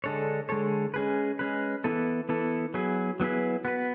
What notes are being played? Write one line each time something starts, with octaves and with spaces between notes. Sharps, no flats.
D3 G#3 D4 A4 C#5
D3 G#3 D4 A4 C#5
G#3 C#4 G#4 B4
G#3 C#4 G#4 B4
E3 B3 E4 A4
E3 B3 E4 A4
F#3 B3 E4 G#4 B4
F#3 B3 E4 G#4 B4
B3 F#4 B4